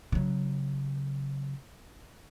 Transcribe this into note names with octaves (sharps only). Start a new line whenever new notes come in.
C#3 F#3